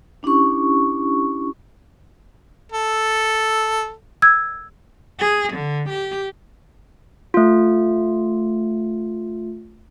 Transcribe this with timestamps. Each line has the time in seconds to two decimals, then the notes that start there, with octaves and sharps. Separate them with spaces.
0.23 C#4 D4 E4 G4 C#6
2.72 A4
4.22 E6 G#6
5.19 G#4
5.53 D3
5.90 G4
7.34 A3 F4